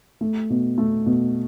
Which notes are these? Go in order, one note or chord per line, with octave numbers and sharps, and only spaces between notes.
A3
B2
A3
B2